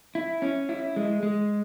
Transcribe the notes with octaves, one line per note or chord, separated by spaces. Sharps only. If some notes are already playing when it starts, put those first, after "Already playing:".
E4
C#4
E4
G#3
G#3